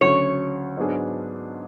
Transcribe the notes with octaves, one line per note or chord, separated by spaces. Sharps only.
D2 C#3 F#3 C#5
G#2 F#3 B3 D4 G#4